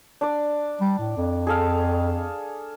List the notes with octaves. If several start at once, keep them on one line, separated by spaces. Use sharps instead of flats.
D4 D5
G3
A2
F2
G#4 A4 F5